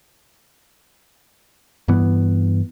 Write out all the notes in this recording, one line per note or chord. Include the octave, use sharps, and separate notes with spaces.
G2 E3 B3